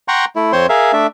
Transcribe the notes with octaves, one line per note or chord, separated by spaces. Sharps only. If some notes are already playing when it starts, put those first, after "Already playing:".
F#5 G5 A#5 C6 C#6
A3 E4
F2 C4 C5 C#5 C6
G#4 A#4 E5 F5
A3 D4 E5